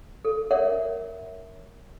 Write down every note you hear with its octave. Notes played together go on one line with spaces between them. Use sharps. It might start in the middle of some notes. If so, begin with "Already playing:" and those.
A4
A#4 C#5 D5 E5 F#5